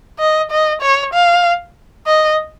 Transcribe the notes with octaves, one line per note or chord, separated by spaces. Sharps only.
D#5
D#5
C#5
F5
D#5